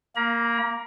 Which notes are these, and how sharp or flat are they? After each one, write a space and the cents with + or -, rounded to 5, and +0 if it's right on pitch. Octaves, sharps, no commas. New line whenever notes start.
A#3 +0 A#5 +40